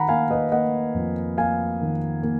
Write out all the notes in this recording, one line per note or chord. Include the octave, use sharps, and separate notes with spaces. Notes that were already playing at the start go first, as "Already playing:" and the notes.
Already playing: D#3 F#5 A#5 B5
A#3 F5 G#5
B4 D#5
A#3 D#5 F#5
F2
A#3 F5 G#5
D#3
A#3